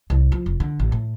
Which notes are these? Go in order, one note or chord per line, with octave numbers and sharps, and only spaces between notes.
C2
F3
F1
D3
A1
A2